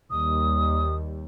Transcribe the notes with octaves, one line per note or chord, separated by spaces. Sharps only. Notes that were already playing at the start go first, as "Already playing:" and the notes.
D#2 G3 D#6